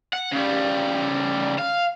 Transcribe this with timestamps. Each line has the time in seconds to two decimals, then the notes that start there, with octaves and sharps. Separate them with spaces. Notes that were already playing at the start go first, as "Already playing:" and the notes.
0.13 F#5
0.33 C#3 G3
1.58 F5